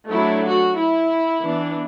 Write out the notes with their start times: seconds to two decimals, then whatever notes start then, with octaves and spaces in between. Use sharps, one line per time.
0.10 F#3 A3 D4 E4
0.44 F#4
0.77 E4
1.43 E3 B3 D4